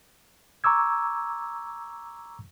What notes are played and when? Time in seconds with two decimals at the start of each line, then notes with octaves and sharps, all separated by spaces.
0.64 A#5 C#6 D6 E6 G#6